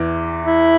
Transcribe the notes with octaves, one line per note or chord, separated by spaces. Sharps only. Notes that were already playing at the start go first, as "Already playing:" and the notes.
Already playing: E2 E3
E4